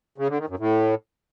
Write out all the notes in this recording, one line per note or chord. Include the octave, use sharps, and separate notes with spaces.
C#3
D3
D#3
F#2
A2